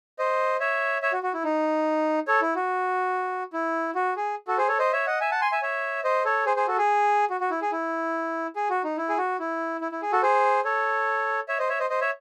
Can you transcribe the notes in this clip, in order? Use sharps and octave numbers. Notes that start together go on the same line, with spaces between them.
C5 D#5
C#5 E5
C#5 E5
F#4
F#4
E4
D#4
A4 C#5
E4
F#4
E4
F#4
G#4
F#4 A4
G#4 C5
A4 C#5
C5 D#5
C#5 E5
D#5 F#5
E5 G#5
F#5 A5
G#5 C6
E5 G#5
C#5 E5
C5 D#5
A4 C#5
G#4 C5
G#4 C5
F#4 A4
G#4
F#4
F#4
E4
G#4
E4
G#4
F#4
D#4
E4
G#4
F#4
E4
E4
E4
G#4
F#4 A4
G#4 C5
A4 C#5
C#5 E5
C5 D#5
C#5 E5
C5 D#5
C5 D#5
C#5 E5